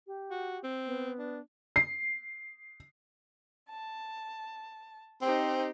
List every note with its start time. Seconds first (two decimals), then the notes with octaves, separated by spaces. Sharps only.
0.07 G4
0.31 F#4
0.64 C4
0.86 B3
1.19 D4
1.76 C7
3.68 A5
5.22 C4 D#4 G4 C5